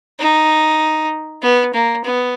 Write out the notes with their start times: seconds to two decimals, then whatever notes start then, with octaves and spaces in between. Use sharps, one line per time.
0.19 D#4
1.42 B3
1.73 A#3
2.04 B3